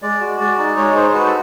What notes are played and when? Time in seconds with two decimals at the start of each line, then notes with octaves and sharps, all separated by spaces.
0.02 G#3 D5
0.21 F#4
0.39 G#3 D5
0.58 D#4
0.77 G#3 C#5
0.95 D#4 C5
1.09 C5
1.14 F#4 B4
1.26 A4